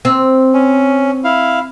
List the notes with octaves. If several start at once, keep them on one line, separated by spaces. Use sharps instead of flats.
C4
C#4
E4 F5